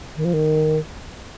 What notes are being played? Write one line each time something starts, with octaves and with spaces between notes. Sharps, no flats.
D#3
F3
D#3